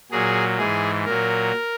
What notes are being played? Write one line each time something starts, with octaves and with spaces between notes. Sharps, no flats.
A#2 F#3 G#4
G#2 E3 G#4
A#2 F#3 A#4